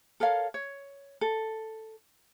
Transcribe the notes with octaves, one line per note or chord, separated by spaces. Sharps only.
A4 A#4 C#5 F5
C#5
A4